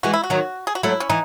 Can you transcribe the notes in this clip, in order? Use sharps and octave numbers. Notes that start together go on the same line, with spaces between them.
E3 G#3 F#4
E4
F#4
D#3 F#3
G#4
F#4
F#3 A3 E4
C#4
E3 D#4